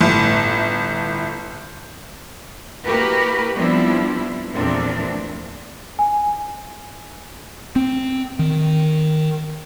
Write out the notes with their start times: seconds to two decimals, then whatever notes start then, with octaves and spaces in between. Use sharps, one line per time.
0.01 G1 A2
2.85 A#3 E4 F#4 G4 A#4 B4
3.54 F3 G3 B3 C4 D4 E4
4.55 E2 A#2 F3 A3 C4 D4
5.99 G#5
7.76 C4
8.39 D#3